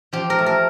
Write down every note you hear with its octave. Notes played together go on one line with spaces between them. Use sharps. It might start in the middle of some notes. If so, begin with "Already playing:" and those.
F3 G4
A#4
A3
A#4